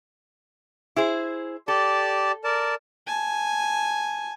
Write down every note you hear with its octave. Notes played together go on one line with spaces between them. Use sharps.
E4 G#4 C5
G4 A4 D5 A5
A#4 D5 A5
G#5 A5